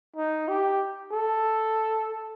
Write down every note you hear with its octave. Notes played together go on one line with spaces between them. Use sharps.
D#4
G4
A4